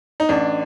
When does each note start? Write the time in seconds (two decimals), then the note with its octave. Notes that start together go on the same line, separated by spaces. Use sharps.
0.20 D#4
0.29 A1 D4